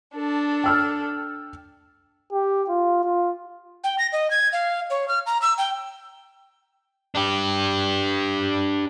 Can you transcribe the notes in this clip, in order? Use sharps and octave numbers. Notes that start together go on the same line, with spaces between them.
D4 A4
G5 E6 F6
G4
F4
F4
G5
A#6
D#5
G#6
F5
C#5
F6
A#5
E6
G5
D4 G4